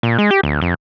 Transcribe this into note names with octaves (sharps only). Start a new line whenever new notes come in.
A#2
G#3
G4
D2
F2